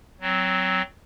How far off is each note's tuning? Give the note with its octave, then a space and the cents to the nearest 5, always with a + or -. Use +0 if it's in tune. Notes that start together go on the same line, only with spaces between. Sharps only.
F#3 +10 C4 +0